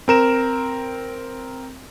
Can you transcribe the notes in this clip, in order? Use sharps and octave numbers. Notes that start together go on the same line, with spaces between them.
C4 A#4 E7